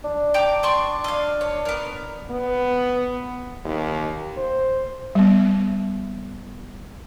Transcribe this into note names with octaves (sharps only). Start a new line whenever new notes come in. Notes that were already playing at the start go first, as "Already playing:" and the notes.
D4
G5 A#5 D6
D5 C6 C#6
D#5 F5
C#5
B3 A#4
B3
D#2
C5
G3 B3